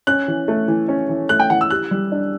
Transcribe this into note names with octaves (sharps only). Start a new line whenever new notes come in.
C#4 F#6
E3
A3
E3
C#4
E3
A3 F#6
G5
E3 F#5
E6
G4 F#6
G3
D4